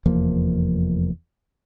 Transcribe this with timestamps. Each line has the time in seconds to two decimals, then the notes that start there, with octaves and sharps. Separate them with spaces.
0.06 F1 E2 F3 A#3